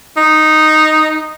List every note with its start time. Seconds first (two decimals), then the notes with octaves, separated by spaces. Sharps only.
0.17 D#4